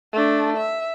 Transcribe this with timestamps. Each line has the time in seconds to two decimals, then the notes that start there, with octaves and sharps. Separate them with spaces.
0.13 A3 D4
0.57 E5